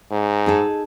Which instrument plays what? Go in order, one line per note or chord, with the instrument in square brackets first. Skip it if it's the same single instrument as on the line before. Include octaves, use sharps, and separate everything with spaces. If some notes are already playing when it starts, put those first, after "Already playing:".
[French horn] G#2
[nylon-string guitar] D#4 G#4 A4